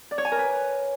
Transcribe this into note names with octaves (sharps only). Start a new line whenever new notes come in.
D5
C#5
G#5
A#4
B4